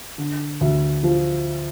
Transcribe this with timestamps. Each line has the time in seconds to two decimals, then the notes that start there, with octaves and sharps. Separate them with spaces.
0.18 D3
0.61 D2
1.03 F3